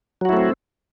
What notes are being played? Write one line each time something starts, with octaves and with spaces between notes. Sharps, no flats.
F#3 A3 C4 E4 F#4